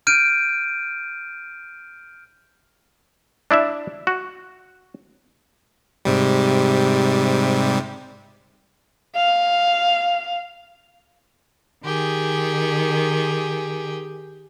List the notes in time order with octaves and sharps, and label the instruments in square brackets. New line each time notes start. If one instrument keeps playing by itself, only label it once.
[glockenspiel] F6 G6 D7 D#7
[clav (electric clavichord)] D4 E4 D5 E5
F#4
[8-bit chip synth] G#2 C3 G3
[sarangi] F5
[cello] D#3 [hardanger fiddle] G4 G#4